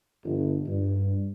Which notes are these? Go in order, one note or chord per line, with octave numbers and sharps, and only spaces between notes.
G1
G2